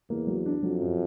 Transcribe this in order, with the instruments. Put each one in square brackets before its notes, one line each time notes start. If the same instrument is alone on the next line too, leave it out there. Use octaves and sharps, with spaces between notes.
[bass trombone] E2 [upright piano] A#3
[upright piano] F#3
D4
[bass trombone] F2 [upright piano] F#3
[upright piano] F#2